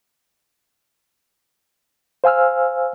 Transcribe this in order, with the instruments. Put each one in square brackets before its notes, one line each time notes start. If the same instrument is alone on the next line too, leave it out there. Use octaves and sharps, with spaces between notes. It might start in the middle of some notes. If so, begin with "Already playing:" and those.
[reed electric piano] C5 F5 G#5 E6 F6